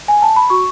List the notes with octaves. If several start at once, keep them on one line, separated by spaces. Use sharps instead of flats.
G#5
A5
B5
F#4 C#6